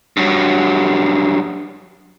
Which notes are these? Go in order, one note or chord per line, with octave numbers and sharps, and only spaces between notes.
G2 F#3